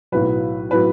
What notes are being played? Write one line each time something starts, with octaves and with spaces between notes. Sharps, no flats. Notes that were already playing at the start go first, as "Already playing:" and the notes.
B1 A2 F#3 B4
A2 F#3 B4